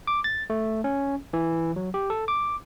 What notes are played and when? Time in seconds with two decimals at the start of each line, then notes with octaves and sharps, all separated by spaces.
0.07 D6
0.24 A6
0.50 A3
0.84 C#4
1.33 E3
1.76 F#3
1.94 G4
2.10 A4
2.28 D6